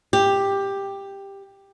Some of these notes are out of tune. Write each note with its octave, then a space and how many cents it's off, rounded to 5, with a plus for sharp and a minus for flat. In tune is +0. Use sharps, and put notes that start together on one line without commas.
G4 +10